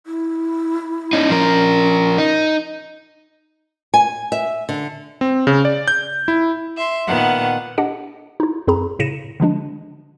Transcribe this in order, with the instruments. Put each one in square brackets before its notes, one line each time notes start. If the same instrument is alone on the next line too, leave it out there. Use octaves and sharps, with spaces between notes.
[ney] E4
[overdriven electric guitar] C#4 D#4
[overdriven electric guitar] F3 A#4 [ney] C#4
[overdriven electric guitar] D#4
[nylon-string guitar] G#5
E5
D3
[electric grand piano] C4
C#3
D5
G6
E4
[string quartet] E5 C6
A#2 D#3 B3 F#5
[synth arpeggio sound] D4 G4 D#5 F#5
D#4 E4
F#2 C4 G#4 A#5 B5
A2 C#3 A#6 C#7 D#7 E7
D3 F3 G#3 D4